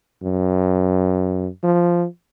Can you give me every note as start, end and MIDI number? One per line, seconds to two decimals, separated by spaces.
0.23 1.49 42
1.64 2.06 53